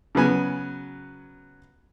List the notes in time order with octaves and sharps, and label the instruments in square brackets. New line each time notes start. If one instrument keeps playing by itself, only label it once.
[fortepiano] C#3 F#3 B3 G#5